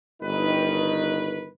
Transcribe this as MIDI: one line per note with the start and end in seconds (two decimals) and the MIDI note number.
0.22 1.48 31
0.22 1.48 51
0.22 1.48 63
0.22 1.48 71